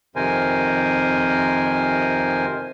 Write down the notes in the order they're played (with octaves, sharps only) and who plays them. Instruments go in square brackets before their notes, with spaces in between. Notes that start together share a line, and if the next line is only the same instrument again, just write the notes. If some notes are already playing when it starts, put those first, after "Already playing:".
[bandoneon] F2 C3 D#3 A#4 C5 G#5